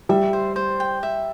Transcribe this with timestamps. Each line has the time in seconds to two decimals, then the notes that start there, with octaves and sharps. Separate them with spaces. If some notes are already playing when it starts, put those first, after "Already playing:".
0.09 G3 E5
0.33 C5
0.56 C5
0.80 G5
1.03 E5